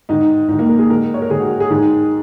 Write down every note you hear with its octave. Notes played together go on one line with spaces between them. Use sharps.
G#2 D#3 D#4
G#2 D#4
D#3
A#3
A#4
G#4
G#2 D#3 A#4
C#5
A#4
G#2 D#3 G#4
F#4
G#4
G#2 D#3